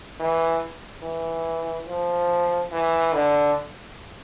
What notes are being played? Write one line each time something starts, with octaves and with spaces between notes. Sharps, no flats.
E3
E3
F3
E3
D3